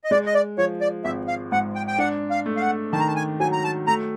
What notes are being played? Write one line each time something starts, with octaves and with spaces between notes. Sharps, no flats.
D#5
G#3 D5
D#5
D5
F3 C#5
D5
G#1 E5
F5
G#2 F#5
G5
G5
D4 F#5
F5
A3
F5
F#5
D#3 A5
A#5
A5
G#5
F#3 G#5
A#5
A5
A3 A#5